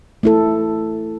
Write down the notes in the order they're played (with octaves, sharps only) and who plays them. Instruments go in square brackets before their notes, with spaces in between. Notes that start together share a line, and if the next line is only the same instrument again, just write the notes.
[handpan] A3 E4 A4